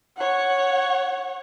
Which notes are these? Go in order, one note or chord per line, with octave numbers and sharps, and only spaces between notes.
C#5 F#5